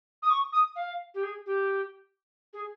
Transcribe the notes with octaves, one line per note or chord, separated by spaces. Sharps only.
D#6
C#6
D#6
F5
G4
G#4
G4
G#4